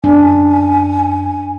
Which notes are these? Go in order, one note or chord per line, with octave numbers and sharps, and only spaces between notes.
F#2 D4 G#5